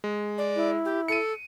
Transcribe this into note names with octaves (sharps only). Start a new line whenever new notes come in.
G#3
D5
E4
G4
A4 C#7 D#7